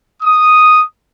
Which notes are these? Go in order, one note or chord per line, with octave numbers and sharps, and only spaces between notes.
D#6